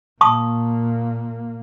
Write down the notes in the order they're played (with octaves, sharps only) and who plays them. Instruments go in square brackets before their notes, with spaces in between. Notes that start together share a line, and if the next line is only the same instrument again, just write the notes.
[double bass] A#2 A#3 [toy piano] A5 C#6 D#6